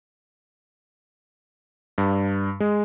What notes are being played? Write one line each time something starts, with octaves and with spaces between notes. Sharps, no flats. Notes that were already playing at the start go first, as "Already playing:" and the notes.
G2
G#3